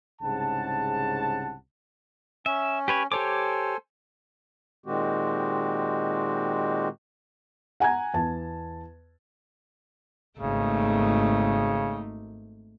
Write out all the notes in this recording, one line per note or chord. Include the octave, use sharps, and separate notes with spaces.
C2 G#2 C#3 F#5 A5
C#4 E5
G4 B4 C#5
G4 A4 C5 C#5 G#5 D6
A#2 D#3 G#3 C4 F#4 G4
F#5 G#5 A#5 G#6
E2 A5
G#1 C#3 A3 A#3 D#4